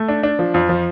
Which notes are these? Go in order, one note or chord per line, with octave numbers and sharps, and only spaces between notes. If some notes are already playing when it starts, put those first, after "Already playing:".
Already playing: A3
D4
D4
F3
F2
F3